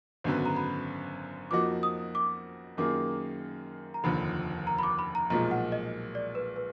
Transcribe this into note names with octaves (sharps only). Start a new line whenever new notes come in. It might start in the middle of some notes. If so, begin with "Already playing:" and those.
G#1 F#2 D3 F#3 B3
A#5
B5
F2 F3 A#3 D#4 F#4 D6
D#6
D6
F#2 D#3 A#3 F4 G#4 D6
A#5
F1 D#2 D3 F3 B5
A#5
B5
D6
B5
A#5
B1 A#2 F3 G#3 A#5
F#5
D#5
D5
B4
B4